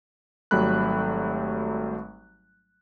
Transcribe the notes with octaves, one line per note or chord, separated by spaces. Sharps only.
G#1 F#3 G3 A3 B5 F#6